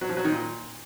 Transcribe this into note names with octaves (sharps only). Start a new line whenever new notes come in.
F#3
F3
F#3
D#3
A#2